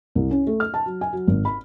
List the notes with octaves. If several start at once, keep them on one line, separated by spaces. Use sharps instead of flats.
C2
C#4
A3
F6
A5
F#3
G#5
F#3
G#1
B5